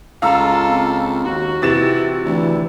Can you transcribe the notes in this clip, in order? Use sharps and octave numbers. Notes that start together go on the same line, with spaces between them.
C#2 F4 A4 F5 A#5 E6
C4
D#2 F#4
C3 E3 F4 A6 E7
D2 E3